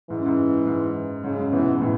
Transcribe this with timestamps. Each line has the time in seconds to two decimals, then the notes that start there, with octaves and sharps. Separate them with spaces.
0.10 G#2 E3
0.18 F#2
0.26 G#2
0.67 G#2
1.24 G#2 C#3
1.32 F#2
1.39 G#2
1.53 G#2 B2 E3
1.82 A2